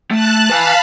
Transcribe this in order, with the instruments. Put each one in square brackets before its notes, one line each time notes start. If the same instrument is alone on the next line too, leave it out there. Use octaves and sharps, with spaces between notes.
[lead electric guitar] A3 [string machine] A5 F#6
[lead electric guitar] B4 G#5 [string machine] F5 A5 B5